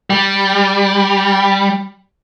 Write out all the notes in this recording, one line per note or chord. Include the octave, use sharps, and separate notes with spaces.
G3